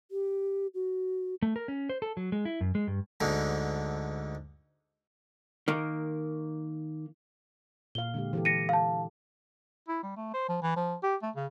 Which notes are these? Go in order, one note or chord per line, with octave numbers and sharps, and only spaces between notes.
G4
F#4
A3
A#4
C#4
C5
A4
F#3
G#3
E4
F#2
G#3
G2
D2 G#2 D3
D#3 A#3
A#2 F5 G7
D3 G#3 G4
E3 G4 A4
A#6 C#7 D#7
F5 A5
E4
G3
A3
C5
F3
E3
F3
G4
A3
C#3